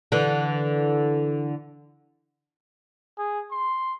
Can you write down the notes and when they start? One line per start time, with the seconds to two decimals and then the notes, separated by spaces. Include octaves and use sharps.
0.12 D3 E3
3.18 G#4
3.51 C6